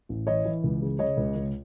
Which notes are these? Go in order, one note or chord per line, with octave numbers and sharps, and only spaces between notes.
A1
E3 C#5 D#5
E3
C#2
C#3
C#3 C#5 D#5
C#2
C#2